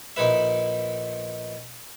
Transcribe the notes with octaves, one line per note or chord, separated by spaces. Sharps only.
A#1 D#4 E4 B4 E5